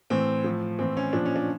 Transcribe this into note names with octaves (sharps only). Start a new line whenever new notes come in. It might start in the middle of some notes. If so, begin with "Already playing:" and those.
A2 E3 C4
A2 F3
A2 E3 C4
C#4
A#2 F3 D4
C#4
D4